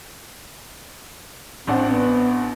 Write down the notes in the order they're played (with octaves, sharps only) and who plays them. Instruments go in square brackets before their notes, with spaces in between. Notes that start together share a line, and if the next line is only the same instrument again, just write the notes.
[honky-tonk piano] A1 D4 F#5 [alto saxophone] C4
[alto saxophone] B3